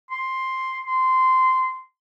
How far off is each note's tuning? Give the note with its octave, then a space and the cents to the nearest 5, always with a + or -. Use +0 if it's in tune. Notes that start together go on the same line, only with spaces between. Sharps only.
C6 +5
C6 -15